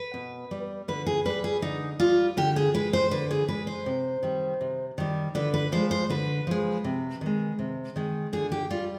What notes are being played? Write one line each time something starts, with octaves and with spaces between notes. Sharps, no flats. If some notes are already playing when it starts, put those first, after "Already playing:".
Already playing: B4
B2
G3
D3 B4
G#4
G3 B4
G#4
D3 D#4
G3 F4
D3 G4
G#4
G#3 B4
C5
D3 B4
G#4
G#3 B4
C5
C3
D#3 G3
C3
D#3 G3
D3 B4
B4
F3 G#3 C5
C5
D3 B4
F3 G#3
C3
D#3 G#3
C3
D#3 G#3
D3 G#4
G4
G3 F4